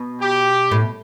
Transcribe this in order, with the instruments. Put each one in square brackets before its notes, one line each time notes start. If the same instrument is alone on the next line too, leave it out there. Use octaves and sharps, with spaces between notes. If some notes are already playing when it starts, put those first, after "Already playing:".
Already playing: [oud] B2
[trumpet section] G4
[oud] A2